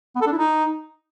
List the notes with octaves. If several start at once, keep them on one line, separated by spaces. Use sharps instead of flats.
B3
A4
D4
E4
D#4